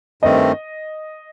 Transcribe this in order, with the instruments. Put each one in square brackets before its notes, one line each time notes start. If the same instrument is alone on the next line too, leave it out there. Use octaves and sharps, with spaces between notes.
[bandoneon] G2 D#3 A3 C4 [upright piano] D#5